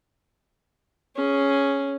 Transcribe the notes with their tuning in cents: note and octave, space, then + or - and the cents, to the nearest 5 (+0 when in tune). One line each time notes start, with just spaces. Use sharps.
C#4 +0 G#4 +5